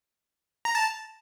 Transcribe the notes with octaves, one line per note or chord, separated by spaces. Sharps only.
A#5
A5